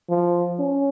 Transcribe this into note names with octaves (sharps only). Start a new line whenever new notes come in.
F3
C#4